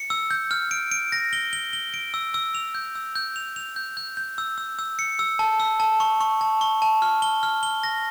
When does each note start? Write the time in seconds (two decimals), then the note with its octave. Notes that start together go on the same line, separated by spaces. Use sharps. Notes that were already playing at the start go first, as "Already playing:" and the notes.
Already playing: C#7
0.10 E6
0.31 G6
0.51 F6
0.71 D7
0.92 D7
1.12 A#6
1.33 G7
1.53 G7
1.73 G7
1.94 D7
2.14 E6
2.34 E6
2.55 F7
2.75 G6
2.95 E6
3.15 G6
3.36 F7
3.56 F7
3.76 G6
3.97 G6
4.17 G6
4.38 E6
4.58 E6
4.79 E6
4.99 C#7
5.19 E6
5.39 A5
5.60 E6
5.80 A5
6.00 C#6
6.21 C#6
6.41 A5
6.61 C#6
6.82 A5
7.02 F6
7.22 G7
7.43 F6
7.63 G7
7.84 A#6